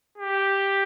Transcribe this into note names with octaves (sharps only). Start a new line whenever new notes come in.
G4